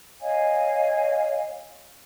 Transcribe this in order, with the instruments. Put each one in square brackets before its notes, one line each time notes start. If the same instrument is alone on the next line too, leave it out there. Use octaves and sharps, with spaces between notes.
[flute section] C#5 D#5 F5 G#5